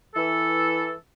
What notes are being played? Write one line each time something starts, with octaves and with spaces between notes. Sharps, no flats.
E3 A4